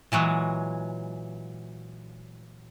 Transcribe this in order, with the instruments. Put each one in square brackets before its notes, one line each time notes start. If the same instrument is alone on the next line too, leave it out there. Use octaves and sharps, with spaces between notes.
[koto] A#2 E3 F#3 G#3